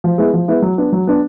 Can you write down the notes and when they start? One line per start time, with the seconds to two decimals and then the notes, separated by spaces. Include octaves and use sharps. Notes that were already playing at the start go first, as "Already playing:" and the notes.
0.04 F3
0.18 G#3 B3 E4
0.33 F3
0.48 G#3 B3 E4
0.62 F#3
0.78 B3 D4
0.92 F#3
1.07 B3 D4